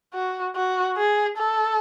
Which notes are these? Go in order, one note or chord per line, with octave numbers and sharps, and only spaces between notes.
F#4
F#4
G#4
A4